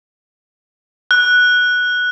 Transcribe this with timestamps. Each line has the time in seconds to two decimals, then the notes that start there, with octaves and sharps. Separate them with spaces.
1.11 F#6